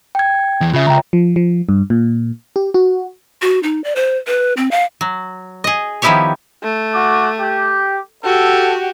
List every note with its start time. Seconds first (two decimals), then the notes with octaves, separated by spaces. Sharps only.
0.15 G5 G#6
0.61 E2
0.73 C#3 F4 E5
0.87 C#2 G5 A#5
1.13 F3
1.36 F3
1.69 G2
1.90 A#2
2.56 G4
2.74 F#4
3.42 F#4
3.63 D#4
3.84 D5
3.96 C5
4.27 B4
4.57 C4
4.71 F5
5.01 F#3
5.64 G#4 D#5
6.02 D#3 F3 B3 E4 G4 C#5
6.63 A3
6.94 F#4 D6
7.40 G4
8.24 F#4 G4 A4